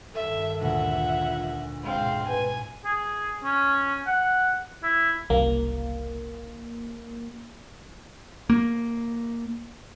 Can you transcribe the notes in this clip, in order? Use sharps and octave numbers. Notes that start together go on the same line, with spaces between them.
G2 D#3 A4 E5
D2 A#2 D3 E5 F#5
F4
G#2 B2 G#3 C4 F5
B4 G#5
G#4
C#4
F#5
E4
F#1 C2 A#3
A#3